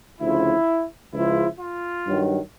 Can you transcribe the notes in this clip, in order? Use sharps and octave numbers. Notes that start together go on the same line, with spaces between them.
D2 C#3 F3 E4
C#2 C#3 F3 E4
F4
G2 D#3 F#3